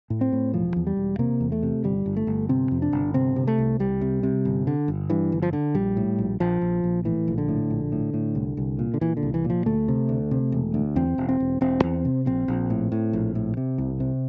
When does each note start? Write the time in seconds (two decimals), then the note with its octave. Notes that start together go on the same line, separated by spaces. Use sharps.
0.10 A2
0.21 C4
0.32 A2
0.53 E1 F3
0.76 E2
0.87 G3
0.97 E1
1.19 C3 A#3
1.40 E2
1.52 A3
1.63 C3
1.84 G1 G3
2.06 G1
2.17 A3
2.27 G1
2.49 C3 C4
2.71 F2
2.82 D4
2.93 G1
3.14 C3 C4
3.36 C3
3.47 A3
3.58 C2
3.79 C2 G3
4.01 C3
4.23 C3
4.45 G1
4.67 D3
4.88 G1
5.10 G2 E3
5.32 G1
5.42 F3
5.53 D3
5.74 A#1 G3
5.97 A2
6.19 A#1
6.40 A#1 F3
6.61 A#1
6.84 A#1
7.05 A2 E3
7.28 A#1
7.38 D3
7.48 A2
7.71 A#1
7.92 A2
8.14 A2
8.35 C2
8.57 C2
8.79 A#2
8.94 D3
9.01 A#2 E3
9.17 D3
9.23 C2
9.34 E3
9.44 A#2
9.50 F3
9.66 D2 A3
9.88 C3
10.09 D2
10.31 C3
10.52 E1
10.74 D2
10.96 E2 C4
11.18 E1
11.29 C4
11.40 E1
11.61 E1 C4
11.83 E2
12.05 C3
12.26 A#1 C4
12.48 A#1
12.70 A2
12.92 A2
13.13 A#1
13.35 A2
13.57 C3
13.78 C2
14.00 C3